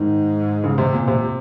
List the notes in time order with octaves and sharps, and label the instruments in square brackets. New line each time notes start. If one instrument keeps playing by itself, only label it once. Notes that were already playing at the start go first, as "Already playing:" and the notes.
Already playing: [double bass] G#2 [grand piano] D#3
[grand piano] C#3
C3
A#2
C3